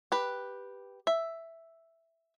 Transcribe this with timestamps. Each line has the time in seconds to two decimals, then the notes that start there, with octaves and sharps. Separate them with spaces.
0.12 G4 B4
1.07 E5